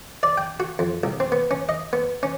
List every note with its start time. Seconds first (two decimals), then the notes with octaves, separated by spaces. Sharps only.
0.23 D5
0.38 G5
0.60 F#4
0.79 F2
1.03 C2
1.20 C4
1.32 B3
1.51 C#4
1.69 D#5
1.93 B3
2.23 C#4